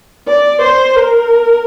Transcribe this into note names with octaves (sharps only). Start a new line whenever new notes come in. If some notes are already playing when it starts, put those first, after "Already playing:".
D5
C5
A#4